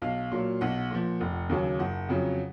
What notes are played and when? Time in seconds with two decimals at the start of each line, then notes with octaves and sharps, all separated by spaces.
0.02 B1 F5
0.32 A#2 F#3
0.61 B1 F#5
0.91 A#2 F3
1.21 F1
1.50 D#2 C#3 F#3
1.79 F#1 F#5
2.09 F2 C#3 F#3